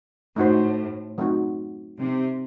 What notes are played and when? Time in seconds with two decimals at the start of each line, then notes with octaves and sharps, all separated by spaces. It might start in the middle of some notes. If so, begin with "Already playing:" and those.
0.36 A2 A3 D#4 F#4 C5
1.18 F#3 A3 C4 D#4 F#4
1.99 C3 G3 C4 D#4